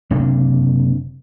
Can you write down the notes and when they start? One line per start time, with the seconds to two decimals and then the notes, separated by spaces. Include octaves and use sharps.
0.11 F#1 C3 A#3 D4